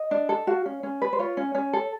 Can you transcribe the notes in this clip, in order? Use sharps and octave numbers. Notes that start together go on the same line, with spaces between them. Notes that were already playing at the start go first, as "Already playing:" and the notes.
Already playing: D#5
D4
A4
F#4 F5
C#4
C#4
B4
C5
F4 C#5
C#4
C#4
A4